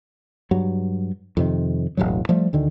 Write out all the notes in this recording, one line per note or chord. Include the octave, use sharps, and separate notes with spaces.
G2 F#3
F2 C3 D#3
E1 A1 F#2 F#3
F3 G3 A3
D2 D3 D#3